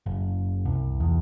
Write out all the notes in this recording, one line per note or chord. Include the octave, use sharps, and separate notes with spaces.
F#1
C2
E2